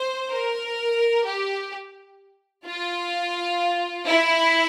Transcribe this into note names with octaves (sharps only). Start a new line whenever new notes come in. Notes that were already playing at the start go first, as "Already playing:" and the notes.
Already playing: C5
A#4
G4
F4
E4